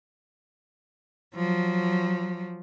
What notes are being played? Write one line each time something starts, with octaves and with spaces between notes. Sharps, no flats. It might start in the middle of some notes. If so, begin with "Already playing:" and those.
F3 F#3